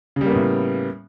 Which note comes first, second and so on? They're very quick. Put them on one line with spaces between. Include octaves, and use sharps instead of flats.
C#3 G3 A#3 B3 A2